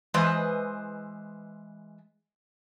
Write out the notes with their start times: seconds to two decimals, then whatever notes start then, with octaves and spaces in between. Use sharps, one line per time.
0.14 E3 G#3 B4 C5 D#5